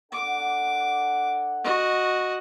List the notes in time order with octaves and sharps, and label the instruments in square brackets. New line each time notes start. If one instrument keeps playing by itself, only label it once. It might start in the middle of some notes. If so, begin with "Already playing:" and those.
[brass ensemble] D4 A4 F#5 [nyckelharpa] D6
[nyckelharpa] F#4 D#5